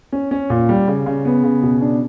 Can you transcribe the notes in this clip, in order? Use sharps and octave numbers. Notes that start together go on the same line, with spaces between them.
C#4
C#4
A#2
G3
C#3
C#3
B3
C#3
B2
D4